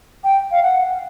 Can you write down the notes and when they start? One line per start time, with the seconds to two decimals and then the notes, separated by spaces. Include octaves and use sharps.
0.24 G5
0.51 F5
0.63 F#5